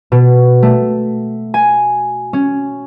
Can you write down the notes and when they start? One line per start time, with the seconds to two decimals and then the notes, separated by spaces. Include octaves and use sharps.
0.12 B2
0.63 A3
1.54 G#5
2.33 C#4